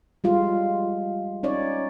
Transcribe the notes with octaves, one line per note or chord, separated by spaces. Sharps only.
G3 G#3 F4
C#4 D#4 C#5 D5